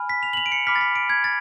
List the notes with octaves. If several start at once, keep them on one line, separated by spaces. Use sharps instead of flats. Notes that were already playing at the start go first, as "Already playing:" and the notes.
Already playing: G#5 B5 F6
B6
F7
F#7
F7
D7
C#7
B5 D6 F6 B6
A6
B6
D7
G#6
A6